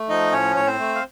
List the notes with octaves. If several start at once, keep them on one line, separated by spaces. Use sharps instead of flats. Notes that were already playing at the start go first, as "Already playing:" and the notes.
Already playing: A3
F3 D#4 D#5
A2 C#4 C#5
A2 C#5
C4 C5
A3
F5